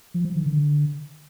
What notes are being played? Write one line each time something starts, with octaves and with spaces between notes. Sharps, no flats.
F3
F3
D#3
D3